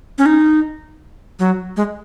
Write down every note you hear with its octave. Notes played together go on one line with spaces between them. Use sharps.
C#4
D#4
F#3
G#3